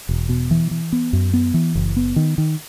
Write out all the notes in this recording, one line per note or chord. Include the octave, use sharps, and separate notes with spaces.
E1
B2
E3
E3
B3
F#2
B3
E3
F#1
B3
D#3
D#3